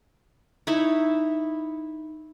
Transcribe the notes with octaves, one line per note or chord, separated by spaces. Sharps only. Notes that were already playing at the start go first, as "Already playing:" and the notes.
D#4 E4 C#5 E5